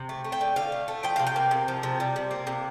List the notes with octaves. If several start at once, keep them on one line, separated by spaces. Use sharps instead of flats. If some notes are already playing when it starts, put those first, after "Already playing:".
Already playing: C3
A3
A3
G5
D3
D3 F5
A3
A3
F3 G5
C3 F5
G5
A#3
C3
F3
C3
G3
C3
A#3
C3